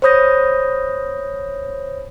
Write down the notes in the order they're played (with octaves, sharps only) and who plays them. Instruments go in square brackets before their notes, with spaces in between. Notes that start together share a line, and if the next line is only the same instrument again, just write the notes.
[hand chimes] C5 C#5 B5 D#6 G6 A#6